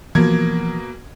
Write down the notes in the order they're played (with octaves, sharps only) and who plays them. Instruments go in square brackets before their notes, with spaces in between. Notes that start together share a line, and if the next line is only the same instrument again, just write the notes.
[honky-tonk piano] B2 A#3 G#6 [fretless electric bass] E3 F3